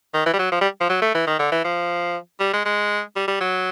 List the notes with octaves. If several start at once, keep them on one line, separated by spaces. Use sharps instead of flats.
D#3
E3
G3
F#3
F3
G3
F3
F#3
A3
E3
D#3
D3
E3
F3
G3
G#3
G#3
G3
G3
F#3